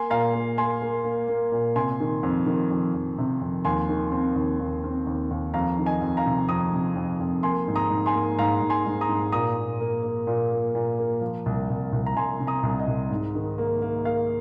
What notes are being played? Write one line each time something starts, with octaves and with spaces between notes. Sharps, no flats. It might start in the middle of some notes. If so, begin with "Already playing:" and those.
Already playing: A#3 G#5 C6
A#2 F5 A#5
A#3
A#3 G#5 C6
A#3
A#3
A#3
A#2
C3 G#5 C6
D#3
F2
D#3
F2
F2
C3
F2
D#2 G#5 C6
D#3
C4
D#2
D#2
C4
D#2
D#2
F2 F5 A#5
D#3
D#5 G#5
F2
F5 A#5
C3
F2 A#5 D#6
C3
F2
F2
A#3 G#5 C6
G#2
A#5 D#6
G#2
G#5 C6
A#3
G#2 F5 A#5
G#2
G#5 C6
G#2
A#5 D#6
G#2
A#2 A#5 D#6
A#2
A#3
A#3
A#2
A#3
A#2
A#3
F3
C2
C2
C2
A#5
C2 G#5 C6
C3
A#5 D#6
C2
D#5
C2
G#2
D#3
A#3
A#3
A#3 F5